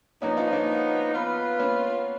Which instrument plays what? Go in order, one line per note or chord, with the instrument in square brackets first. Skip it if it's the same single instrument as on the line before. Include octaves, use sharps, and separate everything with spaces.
[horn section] F3 B3 D#4 [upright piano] A#3 C#4
[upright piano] C#4 F4
A#3 C#4
[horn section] B3 F4 B4
[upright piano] A#3 C#4